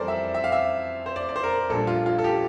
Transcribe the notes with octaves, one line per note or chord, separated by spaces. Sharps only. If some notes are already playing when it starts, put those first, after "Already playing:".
Already playing: F2 E3 G3 C4 A4 A#4 C5 D5
E5
E5
F5
E5
C5
D5
D5
C5
A#4
A#1 A#2 G3 D4 A4
F4
F4
A4
G4